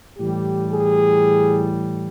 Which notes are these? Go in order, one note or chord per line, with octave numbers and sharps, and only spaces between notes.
A2 E3 G3 G4
G#4